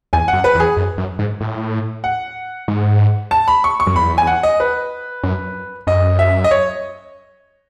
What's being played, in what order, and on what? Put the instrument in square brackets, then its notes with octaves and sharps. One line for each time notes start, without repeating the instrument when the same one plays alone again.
[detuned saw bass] E2 [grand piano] G#5
[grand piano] F#5
[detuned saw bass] F#2
[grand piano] B4
[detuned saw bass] E2
[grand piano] G#4
[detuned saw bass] F#2
F#2
G#2
A2
[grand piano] F#5
[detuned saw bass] G#2
[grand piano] A5
B5
C#6
C#6
[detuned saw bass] F#2
[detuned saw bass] E2 [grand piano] B5
[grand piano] G#5
F#5
D#5
B4
[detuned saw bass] F#2
[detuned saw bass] F#2 [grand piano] D#5
[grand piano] E5
D#5
C#5